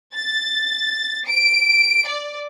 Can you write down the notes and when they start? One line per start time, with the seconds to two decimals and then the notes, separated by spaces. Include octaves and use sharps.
0.14 A6
1.27 D7
2.07 D5